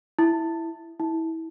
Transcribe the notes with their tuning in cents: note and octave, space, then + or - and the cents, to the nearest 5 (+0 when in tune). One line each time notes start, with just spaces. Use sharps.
E4 +0
E4 -20